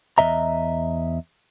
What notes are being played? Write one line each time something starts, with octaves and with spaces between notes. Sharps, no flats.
E2 F#3 D#5 E5 A#5